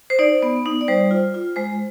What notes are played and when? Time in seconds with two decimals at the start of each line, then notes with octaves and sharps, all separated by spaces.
0.10 C5
0.19 D#4 D5
0.43 B3
0.66 D#4
0.81 D5
0.88 G3 C5
1.11 F4
1.34 F4
1.56 G#3 C5